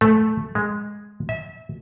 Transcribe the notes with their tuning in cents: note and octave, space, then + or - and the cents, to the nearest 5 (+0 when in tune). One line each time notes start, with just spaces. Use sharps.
A3 -10
G#3 -5
E5 -25